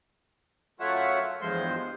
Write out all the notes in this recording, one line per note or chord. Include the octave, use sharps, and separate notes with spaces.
F#2 A3 F4 C#5 E5 F#5
E2 G2 F3 G#3 C5 C6